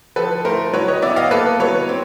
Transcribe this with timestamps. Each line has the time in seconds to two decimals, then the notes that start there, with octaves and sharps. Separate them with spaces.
0.16 F3 A4 B4
0.45 A3 A#4 C5
0.73 F#3 B4 C#5
0.88 C#5 D#5
1.02 B3 D5 E5
1.16 D#5 F5
1.31 A#3 A4 B4
1.60 F#3 B4 C#5
1.89 C4